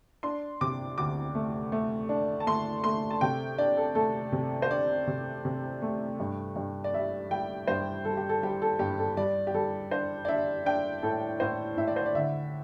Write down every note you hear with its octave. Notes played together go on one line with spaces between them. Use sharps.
D4 C6
C3 D6
D2 D6
A3
A3
D4
A5
A3 C6
A3 C6
A5
C3 G5
D4 D5
A4
A3 A4
C3
C5
D4 D5
C3
C3
A3
G2
G2
D5
G3 E5
G3 G5
G2 C5
G3 A4
G4
A4
G3 G4
A4
G2 G4
A4
G3 D5
G4
G3 A4
D4 C5
D5
D4 E5
D4 G5
A2 A4
A2 C5
A2 E5
D5
C5
D5
D3 E5